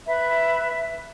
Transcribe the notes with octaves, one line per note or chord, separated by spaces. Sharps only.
B4 E5 B5